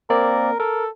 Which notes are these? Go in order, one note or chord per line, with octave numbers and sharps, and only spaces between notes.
A#3 C4 A#4 D5
A4 A#4